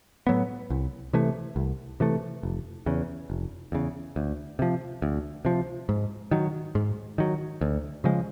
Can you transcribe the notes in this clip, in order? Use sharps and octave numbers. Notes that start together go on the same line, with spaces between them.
A2 F#3 B3
C2
C3 E3 A3
C2
C3 E3 A3
F1
E2 C#3
F1
E2 C#3
D2
C3 F3
D2
C3 F3
G#2
D#3 F#3
G#2
D#3 F#3
D2
C#3 F3 G#3